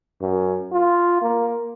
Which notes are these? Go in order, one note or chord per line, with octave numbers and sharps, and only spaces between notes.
F#2
F4
A#3